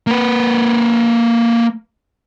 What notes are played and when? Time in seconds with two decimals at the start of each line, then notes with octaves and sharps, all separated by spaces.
0.07 A#3 B4